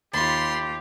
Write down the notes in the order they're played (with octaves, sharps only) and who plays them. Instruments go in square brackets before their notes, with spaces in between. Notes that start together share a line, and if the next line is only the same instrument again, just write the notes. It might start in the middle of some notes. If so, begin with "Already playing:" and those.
[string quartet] D#2 F4 [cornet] G4 [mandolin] A5 [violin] B5 C6